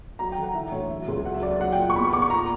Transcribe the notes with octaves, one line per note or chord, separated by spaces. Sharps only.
F#3 A#5
G5
D3 F#5
E3 E5
D2 C#5
F#3 E5
C#2
F#3 F#5
E5
F#3 D5
E5
F#3 F#5
A#2 G5
C#6
E2 B5
C#6
E2 D6
C#6
A#2 A#5